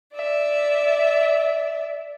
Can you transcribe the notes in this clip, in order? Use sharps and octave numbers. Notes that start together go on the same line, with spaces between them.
D5 E5